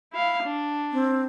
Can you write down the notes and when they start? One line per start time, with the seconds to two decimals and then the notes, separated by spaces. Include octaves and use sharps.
0.13 E4 F5
0.43 D4
0.92 C4